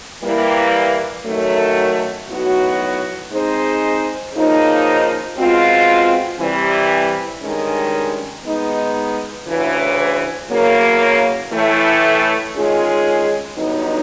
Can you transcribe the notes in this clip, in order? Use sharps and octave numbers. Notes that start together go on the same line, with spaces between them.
E3 G3 A#3
F#2 D#3 F#3 A3
A2 F#3 B3 D#4 F#4
G#3 C4 D#4 G#4 C5
C#3 F3 A#3 D#4
B2 G#3 C4 F4
C3 E3 G3
G2 D#3 G#3 C#4
G#3 B3 D#4
D2 C#3 E3
E2 C#3 F#3 A#3
A2 E3 A3
D#3 G#3 C#4 F4 G#4
G2 D3 F#3 B3 D#4